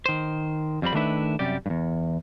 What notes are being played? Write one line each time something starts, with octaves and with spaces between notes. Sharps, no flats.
D#3 C5
F2 G3 C4 B5
D#3 A3 D4 E4 B4
F#2 C3 G3 G4 D5
E2 G2